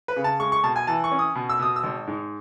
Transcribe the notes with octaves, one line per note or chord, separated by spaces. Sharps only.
B4
C#3
A5
G#3 C#6
C#6
B2 A5
G#5
E3 A5
C#6
C#4
D#6
B2
E6
B2 D#6
E6
G#1
G#2